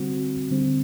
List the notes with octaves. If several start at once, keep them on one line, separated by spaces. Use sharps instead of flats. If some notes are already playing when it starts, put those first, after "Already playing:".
Already playing: D3 G3 C4 F#4
D3 G3 C4